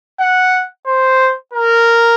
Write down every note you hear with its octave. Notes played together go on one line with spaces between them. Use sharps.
F#5
C5
A#4